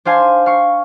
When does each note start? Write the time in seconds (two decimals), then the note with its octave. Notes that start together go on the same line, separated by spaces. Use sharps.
0.05 D4 C5 F5 G#5
0.46 F5 C#6